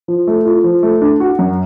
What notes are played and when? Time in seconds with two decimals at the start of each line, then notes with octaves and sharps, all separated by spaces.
0.08 F3
0.27 A3
0.45 F4
0.64 F3
0.83 A3
1.01 D4
1.20 F#4
1.39 F#2